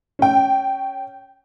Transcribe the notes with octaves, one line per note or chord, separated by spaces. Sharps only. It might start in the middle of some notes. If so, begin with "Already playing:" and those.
C#4 G5